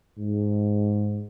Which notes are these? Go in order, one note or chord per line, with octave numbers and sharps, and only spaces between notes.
G#2